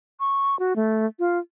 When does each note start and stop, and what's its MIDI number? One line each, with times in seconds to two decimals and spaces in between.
0.20 0.58 85
0.59 0.76 66
0.76 1.06 57
1.19 1.39 65